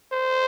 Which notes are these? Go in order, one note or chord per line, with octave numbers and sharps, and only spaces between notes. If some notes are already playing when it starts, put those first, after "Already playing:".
C5